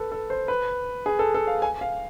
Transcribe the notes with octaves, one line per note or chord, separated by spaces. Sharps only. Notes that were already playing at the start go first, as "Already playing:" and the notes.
Already playing: A4 B4
A4
C5
B4
G#4
A4
A4
F5
G#5
F5